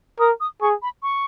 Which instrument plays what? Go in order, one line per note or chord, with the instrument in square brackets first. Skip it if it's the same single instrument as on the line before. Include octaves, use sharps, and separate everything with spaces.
[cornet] A#4 [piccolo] D#6
[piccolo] D#6
[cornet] G#4 [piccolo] C#6
[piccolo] B5
C#6